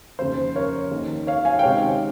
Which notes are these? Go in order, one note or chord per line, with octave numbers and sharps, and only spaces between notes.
F1 D#2 C#3 C5
A#4 C#5
D#2 D#3
C#5 F5
F5 G#5
G5
C#2 C3 D#3 C#5 F5